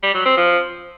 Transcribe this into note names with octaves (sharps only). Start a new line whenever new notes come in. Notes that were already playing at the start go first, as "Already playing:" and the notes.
G3
F#3
C4
F3